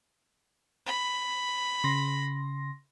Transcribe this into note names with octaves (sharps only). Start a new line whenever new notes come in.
B5
C#3 C6 A#6